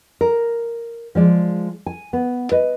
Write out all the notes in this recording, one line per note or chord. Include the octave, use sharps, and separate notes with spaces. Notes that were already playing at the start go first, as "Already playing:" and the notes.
A#4
F3 G#3 D5
G#5
B3
B4 D#5